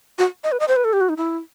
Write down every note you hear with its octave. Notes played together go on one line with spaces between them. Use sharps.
F#4
D#5
B4
D#5
C5
B4
A4
G4
F#4
D#4
E4